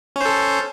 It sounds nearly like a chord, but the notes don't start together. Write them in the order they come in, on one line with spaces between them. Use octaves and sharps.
C#4 C5 A4